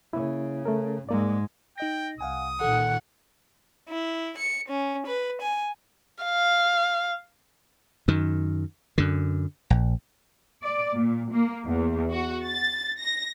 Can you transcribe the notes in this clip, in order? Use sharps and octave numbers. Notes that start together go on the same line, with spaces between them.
C#3 A#3 E4
A3 A4 A#4
G#2 G#3 A#3 D5
D#4 D#5 G5 A#6
C2 F5 F#5 G#5 D#6
A#2 D#3 A4 F#5
E4
C#7
C#4
B4
G#5
F5
F#2 D#3
F#2 D3
A#1
D5
A#2
A#3
E2
F#4
A6
A#6